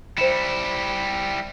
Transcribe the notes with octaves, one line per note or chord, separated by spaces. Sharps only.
G3 E4 C5 C#7 E7